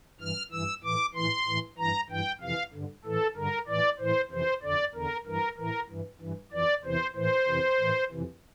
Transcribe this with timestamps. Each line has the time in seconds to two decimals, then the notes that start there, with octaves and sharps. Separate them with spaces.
0.20 G2 E3 F6
0.52 G2 E3 E6
0.84 A2 E3 D6
1.15 A2 E3 C6
1.46 A2 E3
1.78 G2 E3 A#5
2.10 G2 E3 G5
2.41 F2 C3 E3 F5
2.73 G2 D3
3.05 A2 E3 A4
3.36 G2 D3 A#4
3.68 A2 E3 D5
3.99 A2 E3 C5
4.31 F2 C3 E3 C5
4.63 F2 D3 D5
4.95 E2 D3 A#4
5.26 G2 E3 A#4
5.58 A2 E3 A#4
5.90 G2 E3
6.21 G2 E3
6.52 F2 E3 D5
6.85 E2 C3 E3 C5
7.16 A2 E3 C5
7.48 F2 C3 E3
7.80 A2 E3
8.11 F2 C3 E3